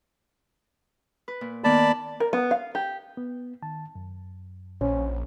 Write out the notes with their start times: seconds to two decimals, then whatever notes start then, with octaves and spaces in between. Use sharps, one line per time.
1.28 B4
1.41 A#2
1.64 D#3 A#3 B3 D5 A5 B5
2.20 A#4
2.33 B3
2.51 F5
2.75 G4
3.17 B3
3.62 D#3 A5
3.95 F#2
4.81 A#1 C#4 C5